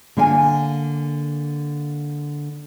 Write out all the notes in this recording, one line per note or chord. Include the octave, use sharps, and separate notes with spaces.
D3 A#3 F5 G#5